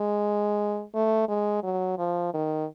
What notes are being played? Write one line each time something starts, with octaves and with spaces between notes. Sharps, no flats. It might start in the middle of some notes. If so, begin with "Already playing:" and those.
Already playing: G#3
A3
G#3
F#3
F3
D#3